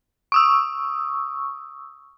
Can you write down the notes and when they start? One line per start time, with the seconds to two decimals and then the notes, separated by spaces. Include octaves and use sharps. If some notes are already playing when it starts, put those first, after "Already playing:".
0.32 C#6 D#6 E6